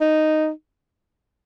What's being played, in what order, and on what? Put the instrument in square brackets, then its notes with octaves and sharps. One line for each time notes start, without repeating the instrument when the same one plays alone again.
[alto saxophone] D#4